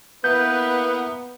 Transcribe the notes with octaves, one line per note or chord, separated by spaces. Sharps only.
A#3 B3 E4 B4 G6